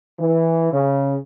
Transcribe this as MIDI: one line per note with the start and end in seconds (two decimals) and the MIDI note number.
0.20 0.70 52
0.72 1.16 49